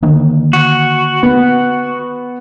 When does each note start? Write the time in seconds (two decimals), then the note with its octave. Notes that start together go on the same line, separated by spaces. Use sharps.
0.02 D3 D#3 A#3
0.53 F#4
1.23 B3